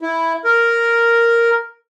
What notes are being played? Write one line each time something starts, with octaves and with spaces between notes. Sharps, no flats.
E4
A#4